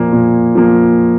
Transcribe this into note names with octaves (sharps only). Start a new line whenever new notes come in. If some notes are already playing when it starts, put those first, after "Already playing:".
Already playing: A#2 F3 A#3
A#2
F3 A#3